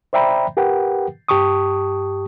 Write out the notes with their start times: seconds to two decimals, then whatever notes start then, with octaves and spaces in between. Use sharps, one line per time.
0.13 C5 D5 E5 G5 A#5 B5
0.57 G4 A#4 B4 F#5 G5
1.29 G2 G4 A5 C#6 D#6